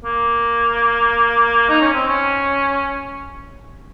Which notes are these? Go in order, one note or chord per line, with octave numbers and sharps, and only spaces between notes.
A#3
D#4
C#4
C4
C#4